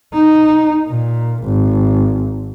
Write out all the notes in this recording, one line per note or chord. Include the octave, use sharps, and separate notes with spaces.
D#4
A#2
G#1